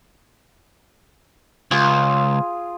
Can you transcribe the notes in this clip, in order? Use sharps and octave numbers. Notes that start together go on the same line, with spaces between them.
C#2 F4 G#4